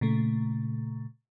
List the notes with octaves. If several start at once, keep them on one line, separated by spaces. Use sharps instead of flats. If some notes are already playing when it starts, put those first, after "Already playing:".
A#2 C#3 A3